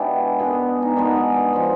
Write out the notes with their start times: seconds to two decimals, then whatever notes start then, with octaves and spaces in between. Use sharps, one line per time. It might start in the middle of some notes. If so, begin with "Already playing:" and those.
Already playing: B2 G#3 B3 D4 E4 G4
0.39 B2 G#3 B3 D4 G#4
0.82 D#4
0.97 B2 G#3 B3 D4
1.53 F3 G#3